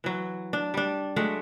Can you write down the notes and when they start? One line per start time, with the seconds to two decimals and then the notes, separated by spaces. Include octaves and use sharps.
0.04 E3 F#3
0.53 D4
0.74 G3 D4
1.16 F#3 G#3 A3 F#5